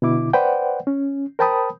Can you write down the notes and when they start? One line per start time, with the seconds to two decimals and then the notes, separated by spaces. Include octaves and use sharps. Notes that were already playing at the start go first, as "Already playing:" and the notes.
0.02 B2 D3 E4 D6
0.33 B4 C5 D5 F#5 G5
0.87 C#4
1.39 A#4 C5 G5 A5 B5 D#6